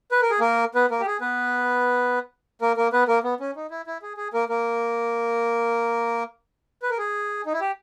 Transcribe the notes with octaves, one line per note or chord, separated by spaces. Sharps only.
B4
A#4
G#4
A#3 A#4
B3 B4
A#3 A#4
G4
G#4
B3 B4
A#3 A#4
A#3 A#4
B3 B4
A#3 A#4
B3
C#4
D#4
E4
E4
G#4
G#4
A#3 A#4
A#3 A#4
B4
A#4
G#4
D#4
E4
G4